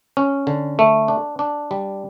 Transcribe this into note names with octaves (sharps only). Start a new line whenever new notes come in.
C#4
D3
A3
D4
D4
G3